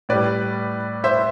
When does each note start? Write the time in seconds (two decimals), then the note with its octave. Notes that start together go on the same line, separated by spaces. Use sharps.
0.09 A2 G3 B4 D5
1.04 C5 E5